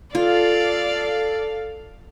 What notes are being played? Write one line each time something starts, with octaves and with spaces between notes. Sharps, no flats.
F4 A4 D5 F5